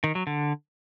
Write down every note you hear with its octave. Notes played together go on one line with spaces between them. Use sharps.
D#3
F#3
D3